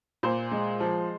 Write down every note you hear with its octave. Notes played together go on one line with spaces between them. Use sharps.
A#2 C5
G#3
F3